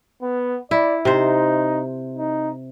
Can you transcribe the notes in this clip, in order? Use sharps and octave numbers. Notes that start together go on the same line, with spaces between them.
B3
E4 D5
C3 D#4 C5
D#4